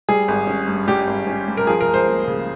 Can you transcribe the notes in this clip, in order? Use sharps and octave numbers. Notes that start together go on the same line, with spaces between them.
G3 G#4
G#1
C#4
G2
G3 G4
G#1
C#4
G2
A#4
F3 G#4
A#4
C#2
C5
A#3
C#3